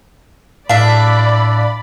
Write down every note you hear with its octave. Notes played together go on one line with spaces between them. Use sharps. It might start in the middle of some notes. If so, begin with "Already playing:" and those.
A2 D4 D5 E5 F5 B5